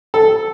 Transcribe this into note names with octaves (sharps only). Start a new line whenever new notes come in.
A4